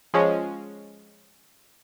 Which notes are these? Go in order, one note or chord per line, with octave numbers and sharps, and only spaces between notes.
F3 G#3 C#4